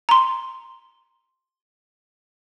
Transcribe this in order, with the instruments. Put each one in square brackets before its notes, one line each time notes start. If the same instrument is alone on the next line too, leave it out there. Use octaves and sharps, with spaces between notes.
[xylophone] A#5 C6